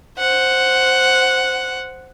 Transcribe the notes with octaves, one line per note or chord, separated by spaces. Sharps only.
C5 F#5